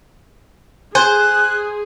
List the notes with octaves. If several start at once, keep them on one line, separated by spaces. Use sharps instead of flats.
G#4 C5 G#5 F#6